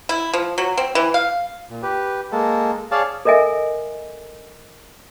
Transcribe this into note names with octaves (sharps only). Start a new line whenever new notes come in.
E4
F3
F#3
C4
E3
F5
A#2
G4 B4
G#3 A#3 A4
G#4 C#5 D5 F5 A5
A4 A#4 D#5 E5 G#5